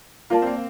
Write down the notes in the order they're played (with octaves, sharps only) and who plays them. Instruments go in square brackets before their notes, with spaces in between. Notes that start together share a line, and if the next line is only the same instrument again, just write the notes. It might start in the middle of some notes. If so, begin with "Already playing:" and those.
[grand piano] A#3 [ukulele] F4 A#4 D5 A5
[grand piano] C4
A#3